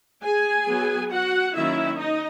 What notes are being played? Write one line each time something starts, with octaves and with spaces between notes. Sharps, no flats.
G#4 G#5
F#3 B3
F#4 F#5
D#3 F#3 A#3 C#4 E4 E5
D#4 D#5